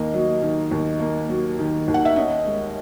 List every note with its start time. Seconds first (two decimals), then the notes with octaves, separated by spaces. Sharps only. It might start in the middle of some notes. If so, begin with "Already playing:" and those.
Already playing: D#2 D#3 A#3 D#5
0.14 F#3
0.42 D#3
0.71 D#2
1.00 A#3
1.29 F#3
1.59 D#3
1.88 D#2
1.94 F#5
2.05 E5
2.16 C#4 D#5
2.46 G#3